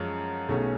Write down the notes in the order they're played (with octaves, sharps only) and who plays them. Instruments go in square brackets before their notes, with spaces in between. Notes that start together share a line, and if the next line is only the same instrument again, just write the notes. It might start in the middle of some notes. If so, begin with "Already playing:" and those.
Already playing: [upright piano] F#2 F3 G#3 C#4
B1 B2 A3 C#4 G#4